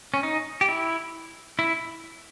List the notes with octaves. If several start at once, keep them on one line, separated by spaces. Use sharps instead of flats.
C#4
D#4
G4
E4
E4